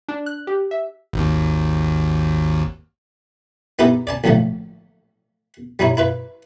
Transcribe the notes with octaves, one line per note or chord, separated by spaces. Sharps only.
D4
F#6
G4
E5
G#1 D#2
B3 D#4 E4 G4 A4 A#4
D5 G#5 A5
A#1 A2 D3 F3 A3
G3 D#4 E4 C#5
E4 F4 B4